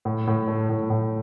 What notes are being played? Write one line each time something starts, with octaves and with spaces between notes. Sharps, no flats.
A2
A2
A3
A2
A2